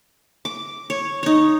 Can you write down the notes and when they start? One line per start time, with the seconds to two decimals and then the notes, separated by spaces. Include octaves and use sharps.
0.45 D6
0.90 C#5
1.23 D#4 C#5